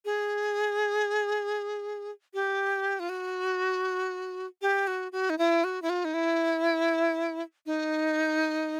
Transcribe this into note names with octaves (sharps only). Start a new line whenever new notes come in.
G#4
G4
F4
F#4
G4
F#4
F#4
D#4
E4
F#4
E4
F4
D#4
E4
D#4